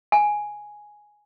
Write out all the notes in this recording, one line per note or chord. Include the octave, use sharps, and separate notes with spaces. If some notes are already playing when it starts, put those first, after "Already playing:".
G#5